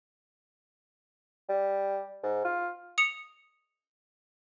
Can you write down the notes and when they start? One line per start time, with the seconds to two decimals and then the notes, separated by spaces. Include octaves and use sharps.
1.49 G3
2.23 G#2
2.45 F4
2.98 D#6 C#7 F7